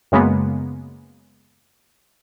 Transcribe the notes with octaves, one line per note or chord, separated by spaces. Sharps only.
F#2 C#3 G#3 A#3 B3